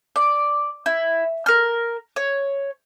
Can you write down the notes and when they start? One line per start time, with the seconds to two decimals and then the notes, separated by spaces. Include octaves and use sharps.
0.16 D5
0.86 E4
1.46 A#4 F6
2.16 C#5